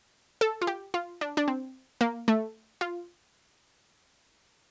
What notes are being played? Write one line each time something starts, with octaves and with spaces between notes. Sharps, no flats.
A4
F4
G4
F4
D4
D4
C4
A#3
A3
F4